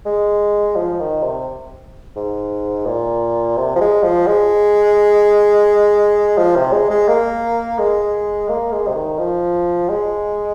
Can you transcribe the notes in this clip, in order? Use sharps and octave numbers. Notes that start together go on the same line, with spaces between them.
G#3
F3
D#3
C3
G#2
A#2
C3
F3
G#3
F3
G#3
F3
C3
G#3
G#3
A#3
G#3
A#3
G#3
C3
D#3
F3
G#3